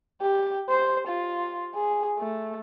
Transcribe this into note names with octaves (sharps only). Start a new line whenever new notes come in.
G4
C5
F4
G#4
A3